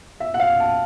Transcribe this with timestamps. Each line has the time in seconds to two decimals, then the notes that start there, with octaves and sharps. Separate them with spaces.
0.20 E5
0.34 F#5
0.40 F5
0.60 A5